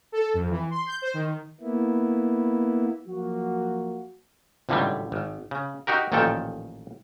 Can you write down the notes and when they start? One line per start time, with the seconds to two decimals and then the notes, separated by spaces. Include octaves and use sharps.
0.12 A4
0.34 F2
0.50 E3
0.70 C6
0.86 G6
1.02 C5
1.14 D#3
1.61 A#3 B3 E4
3.08 F3 F#3 A#3 F#4
4.69 G#1 C#2 A2 D3 F#3 G3
5.12 G#1
5.51 C#3
5.87 D#4 F#4 G4 A#4
6.12 A1 A#2 D#3 F3 A4 G5